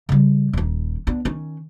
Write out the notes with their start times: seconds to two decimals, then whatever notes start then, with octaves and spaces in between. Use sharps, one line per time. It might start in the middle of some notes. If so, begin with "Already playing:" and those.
0.09 C#3 G3
0.53 D#1 D#4
1.07 B3 D4
1.25 D#3 C#4